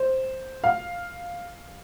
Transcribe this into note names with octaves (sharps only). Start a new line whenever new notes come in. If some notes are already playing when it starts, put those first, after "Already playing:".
Already playing: C5
F5